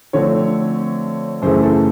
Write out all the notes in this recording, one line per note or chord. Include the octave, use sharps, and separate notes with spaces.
D3 F3 A3 C4 C#5
F#2 C#3 E3 A3 C5
A4